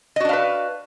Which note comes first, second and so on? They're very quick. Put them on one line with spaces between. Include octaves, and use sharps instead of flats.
D#5 F#4 D4 F5 B4